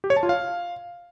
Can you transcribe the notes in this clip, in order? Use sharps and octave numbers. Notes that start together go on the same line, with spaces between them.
G4
C#5
A5
F4
F5